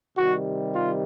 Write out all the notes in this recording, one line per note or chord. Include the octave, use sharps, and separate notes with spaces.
C3 D#3 G3 F#4
F4